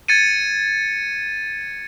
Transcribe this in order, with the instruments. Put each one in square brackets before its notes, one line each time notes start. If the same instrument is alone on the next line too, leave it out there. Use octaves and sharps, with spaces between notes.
[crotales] G#6 A6 C#7 D#7